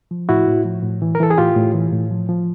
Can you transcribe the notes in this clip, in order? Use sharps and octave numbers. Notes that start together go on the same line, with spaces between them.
F3
A2 E4 F#4
A2
F3
A2
E3
A#4
E3 A4
G#4
A2 F4 G4
A2
E3
A2
F3
F3